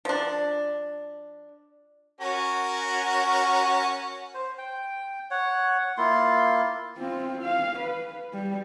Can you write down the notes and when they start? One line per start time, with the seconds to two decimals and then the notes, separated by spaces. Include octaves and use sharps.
0.05 F3 D4
2.21 C#4 F#4 A#4
4.34 C5
4.58 G5
5.31 C#5 F#5
5.98 A#3 E4 F4 C6
6.98 C4 F4
7.42 F5
7.79 B4
8.33 G3